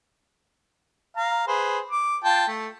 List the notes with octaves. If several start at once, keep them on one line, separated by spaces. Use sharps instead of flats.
F5 A#5
G#4 B4 C5
D6
F4 G5 A5
A3